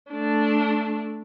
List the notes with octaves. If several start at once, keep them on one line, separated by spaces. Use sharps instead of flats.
A3 D4